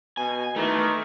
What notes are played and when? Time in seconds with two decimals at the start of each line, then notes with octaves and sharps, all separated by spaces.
0.17 B2 G#5
0.56 D#3 E3 A3